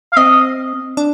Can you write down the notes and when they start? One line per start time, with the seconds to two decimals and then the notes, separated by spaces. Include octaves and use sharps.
0.13 F5
0.17 C4 D#5
0.97 D4